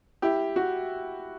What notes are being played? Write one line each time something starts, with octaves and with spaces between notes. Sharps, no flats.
E4 G4
F#4